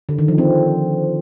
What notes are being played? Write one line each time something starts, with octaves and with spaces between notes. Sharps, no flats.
D3
D#3
F3
C4